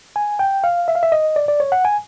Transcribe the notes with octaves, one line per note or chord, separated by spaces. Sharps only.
G#5
G5
F5
E5
F5
E5
D#5
D5
D5
C#5
F#5
G#5